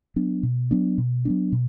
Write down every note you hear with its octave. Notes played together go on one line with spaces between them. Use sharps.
F#3 B3 D4
B2
F#3 B3 D4
B2
F#3 B3 D4
B2